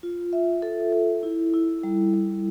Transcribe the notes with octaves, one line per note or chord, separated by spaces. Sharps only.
F4
E5
A4
A4
E4
E4
G3
G3